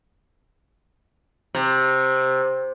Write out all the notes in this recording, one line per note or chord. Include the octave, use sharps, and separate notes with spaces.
C3